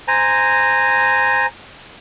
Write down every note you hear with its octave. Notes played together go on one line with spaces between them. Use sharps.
C5 G#5 A#5